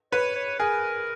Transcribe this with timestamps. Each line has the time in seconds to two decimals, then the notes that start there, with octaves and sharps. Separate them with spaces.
0.12 B4 C#5
0.35 C#5
0.59 G#4 A#4